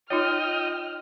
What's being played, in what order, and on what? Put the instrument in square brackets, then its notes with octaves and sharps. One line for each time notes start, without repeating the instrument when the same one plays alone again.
[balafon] D#4 F4 C#5 [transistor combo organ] D#5 G5 [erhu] F6